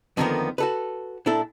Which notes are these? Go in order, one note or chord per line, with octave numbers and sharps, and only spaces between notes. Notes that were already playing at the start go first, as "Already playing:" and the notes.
F2 D3 D#3 F3 A#3 B3
F#4 A4 B4
A#2 D4 E4 A4